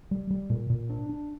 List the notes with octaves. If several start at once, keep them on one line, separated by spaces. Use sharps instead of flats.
G3
G3
A#2
A#2
D4
D4